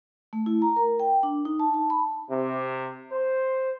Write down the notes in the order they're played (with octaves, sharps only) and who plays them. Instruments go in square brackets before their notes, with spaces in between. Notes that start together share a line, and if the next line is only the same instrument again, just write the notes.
[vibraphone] A3
E4
A#5
A#4
G5
D4
D#4
A5
A5
B5
[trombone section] C3
C5